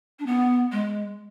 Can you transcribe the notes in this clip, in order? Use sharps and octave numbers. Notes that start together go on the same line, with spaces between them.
D4
B3
G#3